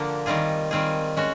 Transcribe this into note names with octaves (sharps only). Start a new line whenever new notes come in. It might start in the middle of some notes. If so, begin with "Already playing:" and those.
Already playing: D3 F3 A#3 D4
D#3 G3 C4 F4 G#4
D#3 G3 C4 F4 G#4
G#3 C#4 F#4